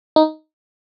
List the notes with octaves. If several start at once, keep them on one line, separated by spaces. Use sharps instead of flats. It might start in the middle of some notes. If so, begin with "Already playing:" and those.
D#4